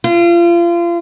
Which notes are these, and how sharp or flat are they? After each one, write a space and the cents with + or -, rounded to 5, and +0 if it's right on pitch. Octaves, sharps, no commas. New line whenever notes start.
F4 -30